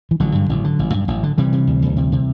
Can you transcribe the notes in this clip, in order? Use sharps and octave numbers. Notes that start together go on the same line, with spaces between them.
E3
A1 D3 F#3
G2
A1
D3
A1
G2
A1
D3
C3 E3 G3
C3
D2
D2
C3
C3